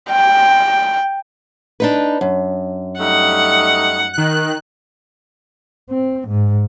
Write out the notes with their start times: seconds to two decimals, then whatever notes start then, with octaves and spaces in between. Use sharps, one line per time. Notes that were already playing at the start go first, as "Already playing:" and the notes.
0.10 G5
1.80 D4 D#4 B4
2.21 F#2
2.99 G3 A3 D#4 F#5
4.13 D#3 F#6
5.90 C4
6.29 G#2